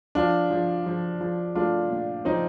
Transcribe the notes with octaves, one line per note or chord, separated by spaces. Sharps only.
F3 D4 F4
F3
F3
F3
A3 D4 F4
A#2
F3 C4 D#4